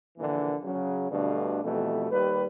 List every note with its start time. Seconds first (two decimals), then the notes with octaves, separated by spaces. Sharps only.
0.17 A#1 D3 E3 A#3
0.63 C#3 F#3
1.11 D2 G2 B2 D3 D4
1.64 F2 B2 E3 G3 A3
2.10 D#2 G3 B4